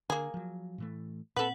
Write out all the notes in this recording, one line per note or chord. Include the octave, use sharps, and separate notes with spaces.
D3 A#3 G#4
F3 F#3
A2 E3 A3
A#2 C4 A4 B4 F#5 F#7